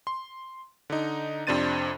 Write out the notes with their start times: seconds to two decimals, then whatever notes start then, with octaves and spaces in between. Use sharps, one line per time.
0.07 C6
0.90 D3 D#4
1.47 F2 C3 D4 C5 A6 D#7